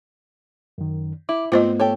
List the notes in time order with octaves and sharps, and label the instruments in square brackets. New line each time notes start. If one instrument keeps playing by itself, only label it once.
[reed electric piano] F#2 D#3
[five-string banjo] E4 [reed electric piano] D6
[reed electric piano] G#2 A3 B3 [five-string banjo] C4 [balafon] F4 C5 D#5
[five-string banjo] G4 A4 C#5